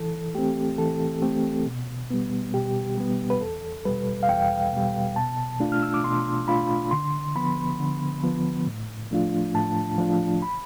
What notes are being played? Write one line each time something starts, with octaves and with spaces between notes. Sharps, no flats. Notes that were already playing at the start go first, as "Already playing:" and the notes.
Already playing: E3 A4
A3 C4 G4
E3 A4
A3 C4 G4
B2
G3 B3
B2 G4
G3 B3
B4
E2 A4
B2 G3 B4
F5
E2 G5
B2 G3
B2 A5
A3 D4 F4
F6
E6
D6
B2 C6
A3 D4 F4 B5
D3 C6
F3 B3 B5
D3
F3 B3
A2
F3 A3 D4 F4
A2 A5
F3 A3 D4 F4
B5